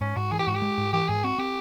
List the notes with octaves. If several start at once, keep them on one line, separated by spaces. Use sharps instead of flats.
G#2 C#4
G#2 F#4
E3 G#4
G4
G#2 F#4
G4
G#3
G#2
E3 G4
G#2 G#4
C4 F#4
C4 G4